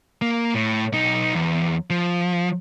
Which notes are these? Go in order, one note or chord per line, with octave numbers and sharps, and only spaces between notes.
A#3
A2
B1 D#4
E2
F3